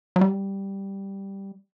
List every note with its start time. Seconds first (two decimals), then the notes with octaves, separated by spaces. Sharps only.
0.16 F#3
0.21 G3